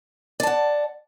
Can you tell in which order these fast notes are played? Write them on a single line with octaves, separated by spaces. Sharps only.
D5 A5 F#5